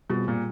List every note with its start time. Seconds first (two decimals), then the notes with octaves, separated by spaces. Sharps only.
0.10 B2 G3 C4 F4 G#4
0.28 A#2